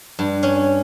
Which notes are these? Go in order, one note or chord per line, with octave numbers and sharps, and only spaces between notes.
G2
C#4